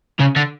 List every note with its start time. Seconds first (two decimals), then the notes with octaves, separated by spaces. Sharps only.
0.20 C#3
0.36 D3